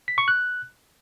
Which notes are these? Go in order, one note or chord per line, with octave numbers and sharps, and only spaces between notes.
B6
C#6
F#6